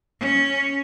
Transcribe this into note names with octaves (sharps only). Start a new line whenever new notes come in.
C#4